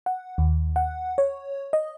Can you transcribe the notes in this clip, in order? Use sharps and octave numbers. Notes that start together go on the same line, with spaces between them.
F#5
D#2
F#5
C#5
D#5